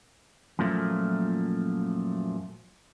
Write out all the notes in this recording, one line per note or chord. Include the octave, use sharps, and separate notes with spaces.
F#2 A#2 F3 A3 A#3